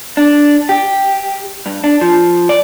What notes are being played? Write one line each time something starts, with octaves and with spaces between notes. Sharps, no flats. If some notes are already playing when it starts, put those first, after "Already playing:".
D4
G4
G2
D4
F3
D5